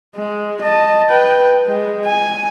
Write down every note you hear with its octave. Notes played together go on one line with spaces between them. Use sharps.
G#3
D#5 A5
B4 G5
G#3
G#5